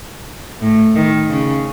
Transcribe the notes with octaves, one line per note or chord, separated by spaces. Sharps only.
A2
D#3
C#3